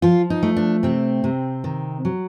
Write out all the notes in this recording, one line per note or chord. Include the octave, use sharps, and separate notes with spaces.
F3 F4
D#4
A3
D4
C3 C4
C3
D#3
F#3